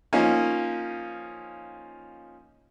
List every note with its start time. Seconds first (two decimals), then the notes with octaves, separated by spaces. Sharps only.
0.13 F3 A#3 C#4 D#4